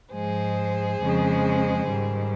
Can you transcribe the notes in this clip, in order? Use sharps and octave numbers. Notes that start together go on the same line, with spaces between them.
G#2 F3 G#3 G#4 C5
F2 C#3 F3 G#3
G#2 D#3 G3